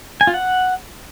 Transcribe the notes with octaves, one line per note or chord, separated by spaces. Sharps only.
G#5
F4
F#5